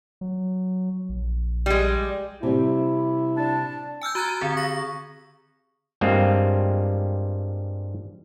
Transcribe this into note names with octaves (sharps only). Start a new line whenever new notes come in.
F#3
A#1
G3 G#3
C3 G3 E4
D4 A5
G#5 E6 F6 G6
F#4 A#5 F#6 G#6 A6
A#5
D3 C4 G#4
C#6 A#6
G2 G3 G#3 A#3 C4 F4